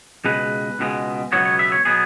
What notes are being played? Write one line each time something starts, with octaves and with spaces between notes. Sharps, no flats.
C#2 B2 G#3 B4
C#2 B2 G#3
C#2 B2 F#3 B3 C#5
C#5
E5
C#5
B2 F#3 B3 G#4